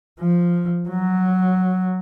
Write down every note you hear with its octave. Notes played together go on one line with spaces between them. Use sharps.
F3
F#3